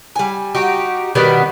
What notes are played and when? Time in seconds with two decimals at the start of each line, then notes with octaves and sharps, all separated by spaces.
0.16 G3 G#5
0.55 D#4 F#4 G4
1.15 B2 D#3 G3 B3